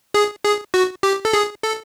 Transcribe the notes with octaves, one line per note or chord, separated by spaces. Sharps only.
G#4
G#4
F#4
G4
A4
G#4
A4